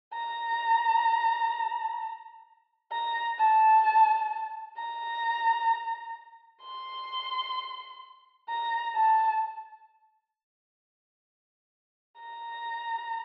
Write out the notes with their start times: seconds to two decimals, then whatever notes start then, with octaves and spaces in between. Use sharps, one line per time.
0.14 A#5
2.92 A#5
3.39 A5
4.78 A#5
6.63 C6
8.49 A#5
8.95 A5
12.20 A#5